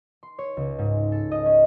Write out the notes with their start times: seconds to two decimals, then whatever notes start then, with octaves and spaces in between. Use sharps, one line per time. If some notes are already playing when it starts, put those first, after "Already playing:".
0.23 C6
0.39 C#5
0.57 C#2
0.79 G#2
1.12 A4
1.32 D#5
1.46 C#4